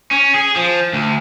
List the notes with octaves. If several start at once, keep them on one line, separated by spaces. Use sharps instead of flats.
C#4
G#4
F3
D2